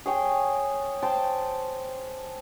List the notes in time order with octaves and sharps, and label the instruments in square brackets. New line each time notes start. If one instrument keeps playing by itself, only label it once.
[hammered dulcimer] G#4 C#5 G5
C5 G5 A5